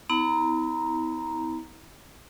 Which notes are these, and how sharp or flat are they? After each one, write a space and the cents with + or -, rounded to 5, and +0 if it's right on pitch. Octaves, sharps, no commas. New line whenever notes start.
B3 +35 E4 -40 A#5 +0